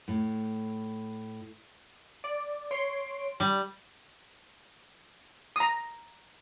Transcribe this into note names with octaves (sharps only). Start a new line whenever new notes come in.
A2
D5
C#5 C6 D7
G3
A#5 D#6